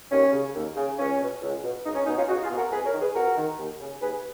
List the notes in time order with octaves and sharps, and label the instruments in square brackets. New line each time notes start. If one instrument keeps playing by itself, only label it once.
[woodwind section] D#2 C#4
C#3
D#2
C#3
C#2 C#4
B2
C#2
B2
C#2 D#4
C#4
B2 D#4
C#4 F4
C#2 D#4 F#4
F4 G#4
B2
F#4 A#4
F2 G#4 B4
A#4 C#5
D#3
G#4 B4
F2 F#4 A#4
D#3
D#2
C#3
D#2 G#4 B4